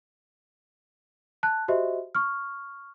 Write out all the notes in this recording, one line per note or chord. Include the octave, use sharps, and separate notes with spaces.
A5 F#6
F#4 G4 C5 D#5 E5
C#6 F6